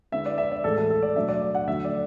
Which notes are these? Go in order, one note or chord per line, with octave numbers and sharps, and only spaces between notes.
D3 G#3 B3 E4 E5
D5
E5
D5
A2 E3 G#3 A4
A4
A4
D5
B2 F#3 A3 D4 E5
D5
D5
F#5
D3 F#3 A3 E5
D5